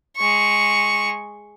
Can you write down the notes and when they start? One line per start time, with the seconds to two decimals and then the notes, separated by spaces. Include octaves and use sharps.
0.17 G#3 C#6